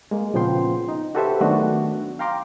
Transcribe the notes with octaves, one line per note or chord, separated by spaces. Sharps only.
G#3 A#3
A#2 C#3 F3 B3 G5 C6
D#4
F#4 G4 A4 B4 C5 E5
D#3 F#3 A3 B3 D4 F#4
F5 G5 A#5 C6 D6